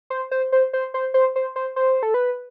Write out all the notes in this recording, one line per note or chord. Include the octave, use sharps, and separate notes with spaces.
C5
C5
C5
C5
C5
C5
C5
C5
C5
A4
B4